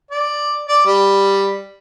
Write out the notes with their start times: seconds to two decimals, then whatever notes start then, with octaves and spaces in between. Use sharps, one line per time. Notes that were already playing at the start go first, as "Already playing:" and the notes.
0.11 D5
0.68 D5
0.86 G3